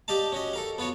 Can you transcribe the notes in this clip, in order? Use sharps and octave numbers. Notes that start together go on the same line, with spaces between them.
G4 D5 D#5 F5 A5
C#4 F#4 D#5
A4 A#4 F5
B3 F4 F#4 C#5